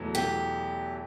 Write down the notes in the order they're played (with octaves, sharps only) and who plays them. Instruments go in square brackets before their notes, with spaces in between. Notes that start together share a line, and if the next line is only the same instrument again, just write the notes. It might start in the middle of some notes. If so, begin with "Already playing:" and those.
Already playing: [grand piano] E2 B2 F#3 A3 E4
[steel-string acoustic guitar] G4